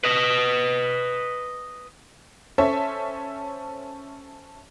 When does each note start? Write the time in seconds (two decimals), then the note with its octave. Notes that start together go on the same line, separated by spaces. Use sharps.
0.04 B4 D#5
2.58 C#4 A4 C5 C#5 E5